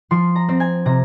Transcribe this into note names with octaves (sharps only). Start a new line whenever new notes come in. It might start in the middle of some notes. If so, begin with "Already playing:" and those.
F3 C6
A#5
C4
G#5
C3 A#5